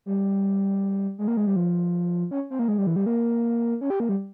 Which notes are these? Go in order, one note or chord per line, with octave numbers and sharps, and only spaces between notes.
G3
G#3
A#3
G#3
G3
F3
C#4
C4
A#3
G#3
G3
E3
G3
A#3
C#4
G4
A#3
G3